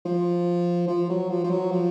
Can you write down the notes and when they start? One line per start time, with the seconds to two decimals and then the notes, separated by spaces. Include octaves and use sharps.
0.05 F3
0.87 F3
1.09 F#3
1.30 F3
1.44 F3
1.50 F#3
1.71 F3